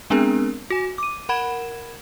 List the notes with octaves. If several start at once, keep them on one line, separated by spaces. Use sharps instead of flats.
G#3 B3 C4 D4 G#4 A#4
F#4 G#5
D6 D#7
A#4 F#5 B5 G#6 E7